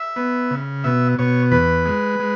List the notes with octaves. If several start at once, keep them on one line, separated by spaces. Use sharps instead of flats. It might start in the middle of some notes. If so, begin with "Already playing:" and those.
Already playing: E5
B3
C#3
B2 E5
B2 C#5
E2 B4
G#3
G#3